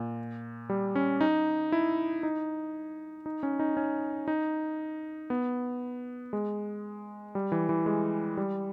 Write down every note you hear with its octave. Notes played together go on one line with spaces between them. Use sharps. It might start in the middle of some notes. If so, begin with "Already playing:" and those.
Already playing: A#2
G3
C#4
D#4
E4
D#4
D#4
C#4
D#4
C#4
D#4
B3
G#3
G3
E3
E3
G#3
G3